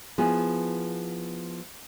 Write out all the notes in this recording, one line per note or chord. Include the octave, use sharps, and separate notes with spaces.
F3 B3 E4 G#4